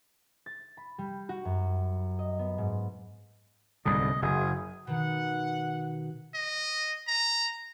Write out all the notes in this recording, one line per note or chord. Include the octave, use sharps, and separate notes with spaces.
A6
B5
G3
F#4
F#2
D#5
B3
G#2
C2 G#2 D3 D#5
F#1 G#4
B2 D#3 F#5
D#5
A#5